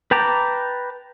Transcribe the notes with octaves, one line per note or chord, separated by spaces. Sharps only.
B4 G5 A5 A#5 D6